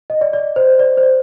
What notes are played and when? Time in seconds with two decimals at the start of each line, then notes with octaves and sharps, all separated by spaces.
0.10 D#5
0.21 D5
0.33 D5
0.56 C5
0.79 D5
0.97 C5
1.03 D5